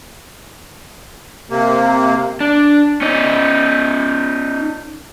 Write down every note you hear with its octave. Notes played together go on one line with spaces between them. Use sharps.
C3 A#3
D4
C#4 D#4